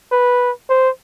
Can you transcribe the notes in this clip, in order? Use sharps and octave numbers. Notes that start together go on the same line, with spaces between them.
B4
C5